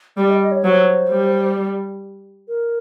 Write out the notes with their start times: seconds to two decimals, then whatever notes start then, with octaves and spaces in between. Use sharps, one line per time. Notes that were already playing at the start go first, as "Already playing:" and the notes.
0.17 G3 D5
0.29 D#5
0.40 D#5
0.52 C#5
0.64 F#3 C5
1.10 G3
2.48 A#4